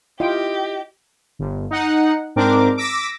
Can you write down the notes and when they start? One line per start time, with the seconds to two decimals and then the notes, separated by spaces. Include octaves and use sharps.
0.20 E4 F4 G4 D#5 G5
1.39 G1
1.71 D#4 F#5
2.36 G#2 C4 D4 A#4 D6
2.78 D6 E6 A#6 B6